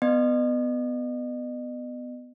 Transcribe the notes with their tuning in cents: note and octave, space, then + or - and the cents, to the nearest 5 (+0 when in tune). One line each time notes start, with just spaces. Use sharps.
B3 +15 D#5 -40